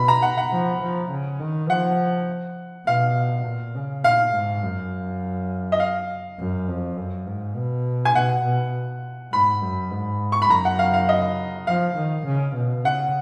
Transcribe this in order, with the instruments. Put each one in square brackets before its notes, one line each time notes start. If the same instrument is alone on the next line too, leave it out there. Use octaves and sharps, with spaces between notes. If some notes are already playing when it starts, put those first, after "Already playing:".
Already playing: [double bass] B2 [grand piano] B5
[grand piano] A#5
F#5
F#5
[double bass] F3
F3
C#3
D#3
[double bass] F3 [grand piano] F#5
[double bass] B2 [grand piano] F5
[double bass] A#2
C#3
[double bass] A#2 [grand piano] F5
[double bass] G#2
F#2
[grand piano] D#5
F5
[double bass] F#2
F2
F#2
G#2
B2
[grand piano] G#5
[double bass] B2 [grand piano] F#5
[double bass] B2
[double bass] G#2 [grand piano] B5
[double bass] F#2
G#2
[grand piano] C#6
B5
[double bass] F#2 [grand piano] A#5
[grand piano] F#5
F5
F5
D#5
[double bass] F3 [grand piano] F5
[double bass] D#3
C#3
B2
[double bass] C#3 [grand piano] F#5